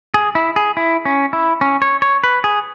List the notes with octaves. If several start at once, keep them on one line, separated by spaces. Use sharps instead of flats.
G#4
E4
G#4
E4
C#4
E4
C#4
C#5
C#5
B4
G#4